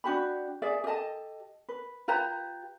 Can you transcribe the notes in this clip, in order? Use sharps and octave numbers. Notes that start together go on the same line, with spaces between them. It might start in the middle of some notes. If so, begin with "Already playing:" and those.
D4 F#4 G4 B5
G#4 D5 E5
G4 A4 D#5 A5
B4
F4 G4 B4 A#5